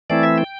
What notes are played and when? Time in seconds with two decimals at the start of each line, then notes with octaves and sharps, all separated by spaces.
0.10 E3 A3 C4 E4 D5
0.23 E5
0.38 G5